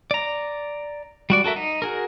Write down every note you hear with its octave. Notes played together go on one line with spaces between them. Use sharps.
D5 A#5
G3 F#4 D5
F#4 A4 A#4 E5
D#4
F#4 G#4 A#4